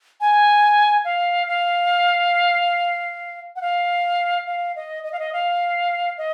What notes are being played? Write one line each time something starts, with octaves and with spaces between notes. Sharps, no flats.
G#5
F5
F5
F#5
F5
F5
D#5
D#5
F5
D#5
F5
D#5